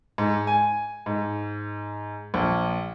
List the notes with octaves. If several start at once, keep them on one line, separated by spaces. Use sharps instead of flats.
G#2
G#5
G#2
A#1